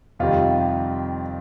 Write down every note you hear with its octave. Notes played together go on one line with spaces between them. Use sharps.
F2 C3 D#3 G3 F4